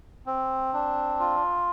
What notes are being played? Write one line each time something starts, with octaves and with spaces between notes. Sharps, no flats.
C4
D4
F4